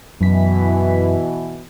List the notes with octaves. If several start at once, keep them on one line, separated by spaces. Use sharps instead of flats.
F#2 B2 E3 B6